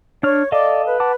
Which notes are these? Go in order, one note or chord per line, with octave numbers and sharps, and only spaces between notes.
D4 C#5 F6
A4 D5 D#5 F5
B4
F#5 A5 D6